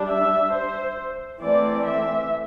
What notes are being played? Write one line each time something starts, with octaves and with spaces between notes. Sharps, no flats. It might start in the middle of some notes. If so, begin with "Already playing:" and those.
Already playing: G3 D4
E5
C5
E3 A3 C4 D5
E5